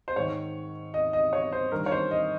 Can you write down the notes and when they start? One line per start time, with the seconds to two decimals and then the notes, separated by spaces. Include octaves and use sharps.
0.08 C5
0.16 G#2 D#3 C#5
0.94 D#5
1.13 D#5
1.33 C#5
1.52 C5
1.72 G2 D#3 A#4
1.86 C#5
1.92 C5
2.11 D#5